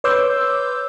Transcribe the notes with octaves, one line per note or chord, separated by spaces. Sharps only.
B4 C#5 C6 D6 E6 G6